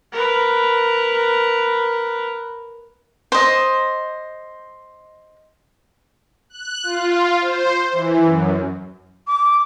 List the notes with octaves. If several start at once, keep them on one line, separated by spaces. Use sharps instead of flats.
A#4 B4
C5 D#5
F#6
F4
C5
E3
F#2
D6